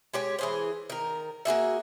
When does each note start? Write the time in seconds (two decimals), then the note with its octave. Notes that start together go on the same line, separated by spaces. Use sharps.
0.13 G#3 G4 C#5
0.39 E3 G#4 C5
0.90 D#3 A#4
1.45 A#3 F#4 G#4 E5